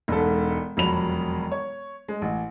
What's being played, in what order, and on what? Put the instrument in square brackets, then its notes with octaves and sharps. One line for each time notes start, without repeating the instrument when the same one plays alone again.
[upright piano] E1 G#2 A4
E1 F2 F#3 B5 F7
C#5
G#3
A1